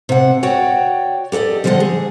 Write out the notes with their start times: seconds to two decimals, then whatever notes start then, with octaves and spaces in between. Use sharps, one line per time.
0.09 C3 F#5
0.43 F#4 C#5 D5 F#5 G5
1.32 G4 A4 C5 D5 D#5
1.64 D3 F3 G3 E4 D#5 F#5
1.80 G#4